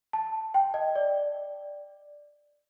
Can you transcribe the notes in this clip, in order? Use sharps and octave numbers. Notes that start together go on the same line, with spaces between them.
A5
G5
D#5
D5